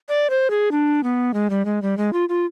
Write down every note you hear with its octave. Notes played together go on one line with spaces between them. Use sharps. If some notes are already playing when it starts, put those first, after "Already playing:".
D5
C5
G#4
D4
B3
G#3
G3
G#3
G3
G#3
F4
F4